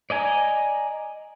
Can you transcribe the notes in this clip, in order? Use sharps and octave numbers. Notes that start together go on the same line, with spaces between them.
D5 D#5 G#5 A#5